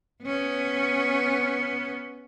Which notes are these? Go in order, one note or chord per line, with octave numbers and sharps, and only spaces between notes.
B3 C#4